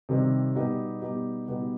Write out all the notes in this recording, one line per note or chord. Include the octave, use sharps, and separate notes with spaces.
C3 D#3 G3 C4 D#4
B2 G3 B3 D#4 G4
B2 G3 B3 D#4 G4
B2 G3 B3 D#4 G4